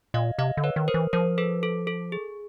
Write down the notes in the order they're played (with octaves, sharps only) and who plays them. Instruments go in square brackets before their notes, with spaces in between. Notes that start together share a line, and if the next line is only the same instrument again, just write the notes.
[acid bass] A#2 [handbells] D#5 F5
[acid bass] C3 [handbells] D#5 F5
[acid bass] D3
[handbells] B4 C#5
[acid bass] D#3
[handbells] A#4 C5
[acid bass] E3
[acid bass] F3 [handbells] A#4 C5
[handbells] A4 B4
A4
A4
G#4